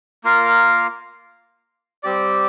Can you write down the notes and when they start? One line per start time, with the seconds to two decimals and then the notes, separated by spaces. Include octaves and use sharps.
0.24 A#3 F4 A#4 F5
2.03 G3 C4 G4 D5